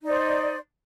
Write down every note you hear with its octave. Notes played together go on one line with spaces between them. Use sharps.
D#4 C5 D5